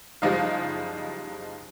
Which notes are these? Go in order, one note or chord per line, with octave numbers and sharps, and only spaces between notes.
F#1 F3 G3 G#3 D#4 F5